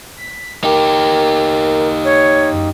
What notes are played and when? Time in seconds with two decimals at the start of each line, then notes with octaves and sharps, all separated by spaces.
0.17 B6
0.64 D#4 G4 A#4
2.05 C#5
2.51 F#2